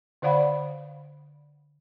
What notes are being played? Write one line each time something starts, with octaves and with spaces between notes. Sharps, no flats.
D3 C5 D5 F5 F#5 B5